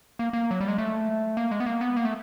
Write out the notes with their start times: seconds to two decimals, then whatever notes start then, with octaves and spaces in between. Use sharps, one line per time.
0.19 A#3
0.33 A#3
0.51 F#3
0.60 G3
0.68 G#3
0.78 A3
1.37 A#3
1.51 G#3
1.60 B3
1.66 A#3
1.81 B3
1.96 A#3
2.05 A3